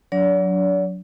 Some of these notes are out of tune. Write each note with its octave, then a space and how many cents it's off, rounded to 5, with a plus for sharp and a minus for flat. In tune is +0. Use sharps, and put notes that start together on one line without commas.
F#3 -15 D4 -35 D5 -45